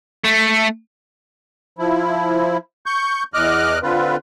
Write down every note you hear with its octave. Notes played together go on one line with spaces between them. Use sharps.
A3
F3 E4
C#6 G6
E2 D#5 D6 F6 F#6
D3 C4 F4 B4